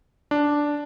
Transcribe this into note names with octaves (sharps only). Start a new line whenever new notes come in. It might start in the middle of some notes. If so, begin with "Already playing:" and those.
D4